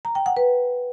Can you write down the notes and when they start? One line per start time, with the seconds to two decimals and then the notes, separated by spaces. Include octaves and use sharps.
0.05 A#5
0.15 G5
0.26 F#5
0.37 B4